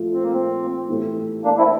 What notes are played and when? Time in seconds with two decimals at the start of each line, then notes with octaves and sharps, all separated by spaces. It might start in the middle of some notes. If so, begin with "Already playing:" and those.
Already playing: A#2 F3 A3
0.14 C4
0.23 A#3
0.33 C4
0.88 A2 E3 A3 E4 G4
1.44 A#3 D4
1.58 C4 E4